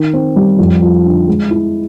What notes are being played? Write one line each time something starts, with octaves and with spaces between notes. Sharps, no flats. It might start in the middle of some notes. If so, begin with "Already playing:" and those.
Already playing: D#3
C4
G3
F2
F3
D3
G#3
E4